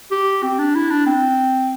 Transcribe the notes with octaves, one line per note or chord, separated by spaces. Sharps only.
G4
C4
D4
E4
D4
C4